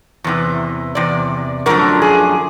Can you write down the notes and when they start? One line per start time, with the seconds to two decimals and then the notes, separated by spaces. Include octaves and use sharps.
0.24 E2 C3 E3
0.95 E2 C3 D5
1.66 F#2 D3 F3 A3 D4 A#4
2.02 G#4